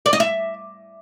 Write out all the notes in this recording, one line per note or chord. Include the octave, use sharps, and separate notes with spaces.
D5
D#5
E5